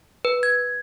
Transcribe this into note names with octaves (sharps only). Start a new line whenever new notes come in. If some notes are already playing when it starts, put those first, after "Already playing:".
B4
G#6